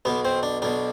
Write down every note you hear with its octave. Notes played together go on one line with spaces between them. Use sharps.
B1 B2 B3
C4
D4
B1 B2 D4